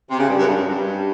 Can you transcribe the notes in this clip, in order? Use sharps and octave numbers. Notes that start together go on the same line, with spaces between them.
C3
C#3
G2
F#2
G2
F#2
G2